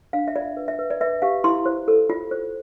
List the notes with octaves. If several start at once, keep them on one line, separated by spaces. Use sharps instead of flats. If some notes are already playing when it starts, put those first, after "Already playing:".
D4 F5
E5
F4 D5
B4
E5
B4
D5
B4 E5
G4 F5
E4 C6
C5
A4
F4
C5